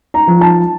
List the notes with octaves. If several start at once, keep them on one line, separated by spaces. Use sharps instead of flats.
A#5
F3
A5